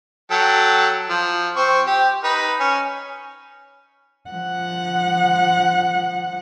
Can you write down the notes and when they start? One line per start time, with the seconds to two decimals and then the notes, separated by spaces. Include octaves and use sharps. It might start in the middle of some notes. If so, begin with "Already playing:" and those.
0.31 F#3 A4 G5
1.09 F3
1.56 C4 C#6
1.87 G4
2.24 D#4 B4
2.60 C#4 G#5
4.31 F3 F#5